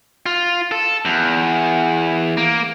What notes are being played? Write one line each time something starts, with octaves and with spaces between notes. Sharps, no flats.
F4
A4
E2
A#3